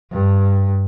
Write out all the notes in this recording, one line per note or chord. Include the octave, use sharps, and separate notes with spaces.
G2